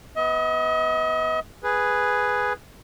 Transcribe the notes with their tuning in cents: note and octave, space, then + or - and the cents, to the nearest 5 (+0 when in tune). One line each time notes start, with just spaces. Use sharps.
B3 +5 D#5 +40
G#4 +0 B4 +0